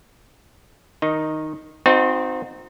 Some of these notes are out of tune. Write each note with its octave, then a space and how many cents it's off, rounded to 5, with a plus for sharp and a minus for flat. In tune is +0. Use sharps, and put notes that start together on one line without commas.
D#3 +0 D#4 +0
C4 -15 D#4 -5 F#4 -45